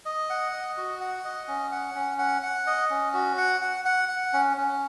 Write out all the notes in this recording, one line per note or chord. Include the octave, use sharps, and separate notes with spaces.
D#5
F#5
D#5
F#4
F#5
D#5
C#4
F#5
C#4
F#5
F#5
D#5
C#4
F#4
F#5
F#5
F#5
F#5
C#4
C#4